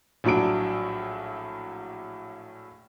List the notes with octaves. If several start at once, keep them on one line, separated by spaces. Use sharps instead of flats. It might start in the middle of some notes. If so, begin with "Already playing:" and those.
A#1 A2 F#3 D4 D7